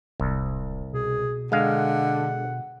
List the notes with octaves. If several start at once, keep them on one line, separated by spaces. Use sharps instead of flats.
D1 C2
B2 G#4
D3 G#3 F5 F#5